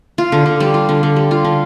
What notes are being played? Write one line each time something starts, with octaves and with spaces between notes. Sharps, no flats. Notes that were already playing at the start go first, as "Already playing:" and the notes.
F4
D3
D3
G3
F4
D3
D3
G3
F4
D3